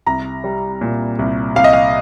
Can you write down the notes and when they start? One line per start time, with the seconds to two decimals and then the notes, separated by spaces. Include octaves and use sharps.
0.06 C2 A#5
0.44 G3
0.81 A#2
1.19 C2
1.56 C2 F5
1.64 D#5
1.73 F5